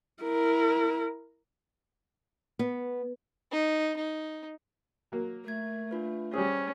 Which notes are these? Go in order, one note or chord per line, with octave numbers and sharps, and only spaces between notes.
E4 A#4
B3
D#4
D#4
F#3 A#3
A3 A#4 G#6
D4 F4 B4
G3 C#4 G#4 C5